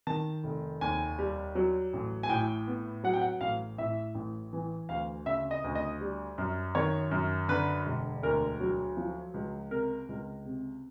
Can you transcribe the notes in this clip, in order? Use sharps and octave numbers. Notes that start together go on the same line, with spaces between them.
D#3 A5
F1
D#2 G#5
G3
F#3
A1
G#5
A2 G5
B3
F#3 F#5
G5
F#5
A1 F5
A2 E5
A1
E3
D2 F5
C#3 E5
D#5
D2
D#5
G3
F#2
D#3 C#5
F#2
D3 B4
E1
D2 A#4
F#3
F3
C#2
C3 A#4
C#2
C3